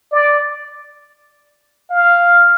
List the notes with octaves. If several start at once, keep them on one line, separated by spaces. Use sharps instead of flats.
D5
F5